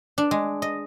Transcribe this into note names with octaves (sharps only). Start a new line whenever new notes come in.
D4
G#3
D#5